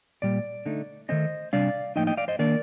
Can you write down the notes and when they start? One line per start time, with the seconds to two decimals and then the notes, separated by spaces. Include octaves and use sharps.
0.22 A#2 G3 D5
0.66 D3 A3 D#4
1.09 D#3 A3 C4 C5 D#5
1.53 C3 G3 D4 D5 F5
1.96 A2 F3 A#3 D#4 D#5 G5
2.07 D#5 G5
2.17 D5 F5
2.28 C5 D#5
2.39 D#3 A#3 D4 A#4 D5